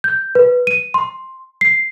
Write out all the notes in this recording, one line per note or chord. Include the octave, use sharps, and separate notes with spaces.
G6
B4
D#7
C6
C7